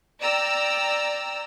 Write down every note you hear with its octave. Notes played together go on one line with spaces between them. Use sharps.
D5 G5 A#5 E6